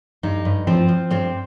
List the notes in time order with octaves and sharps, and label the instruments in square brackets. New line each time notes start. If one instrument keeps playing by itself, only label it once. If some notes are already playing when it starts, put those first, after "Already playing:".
[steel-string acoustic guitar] G2 D#4
G2
F3 C4
F3
G2 C4